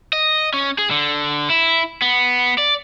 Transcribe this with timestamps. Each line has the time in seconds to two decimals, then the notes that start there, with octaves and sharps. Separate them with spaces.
0.13 D#5
0.54 C#4
0.78 G#4
0.91 D3
1.50 E4
2.02 B3
2.58 D5